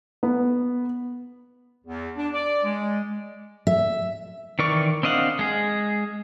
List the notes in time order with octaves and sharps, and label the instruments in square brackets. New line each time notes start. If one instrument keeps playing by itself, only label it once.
[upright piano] B3
[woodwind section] E2
D4
D5
G#3
[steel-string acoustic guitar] E5
[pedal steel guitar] D#3 E3 A#4 D5 C#6
C4 D4 D#5 F5 F#5
G#3 G#4